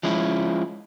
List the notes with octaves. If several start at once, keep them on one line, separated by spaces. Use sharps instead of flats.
F3 G#3 C#4 E4